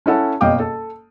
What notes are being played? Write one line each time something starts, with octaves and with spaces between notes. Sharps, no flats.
C#4 E4 A4 F#5
F#1 B2 D#5 F5 G5 D6
A4